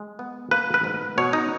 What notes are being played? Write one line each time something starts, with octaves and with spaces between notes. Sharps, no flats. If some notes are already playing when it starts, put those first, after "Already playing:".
Already playing: G#3
B3
A#3 B4
B4
G#2
B2 C#5
D#4